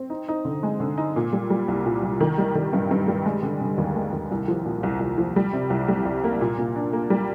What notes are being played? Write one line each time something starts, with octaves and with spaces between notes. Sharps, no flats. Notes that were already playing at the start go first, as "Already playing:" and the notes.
Already playing: C4
D#4
D#4
D3
G#3
D3
D#4
A#2
G3
G3
C2
A#2
C2
D#3
G3
D#3
G2
G2
G3
G#3
D3
D3
D#2
G#3
D#2
C2
F3
A#2
C2
C2
F3
G3
C3
C2
G3
C2
A#3
A#2
A#2
D4
A#3
G3